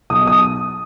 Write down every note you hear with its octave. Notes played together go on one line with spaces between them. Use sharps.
B1 D#6
D#6